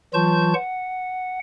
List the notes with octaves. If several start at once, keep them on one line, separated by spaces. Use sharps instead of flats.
E3 F#3 F4 A5 C#6 G6
F#5